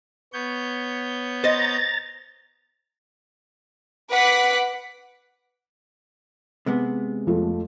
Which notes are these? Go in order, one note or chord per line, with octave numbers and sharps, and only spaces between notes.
B3 C#5 G6
C5 D#5 A#5 A6
B4 F#5 D6 F#6 B6
C3 G#3 B3
F2 F3 A3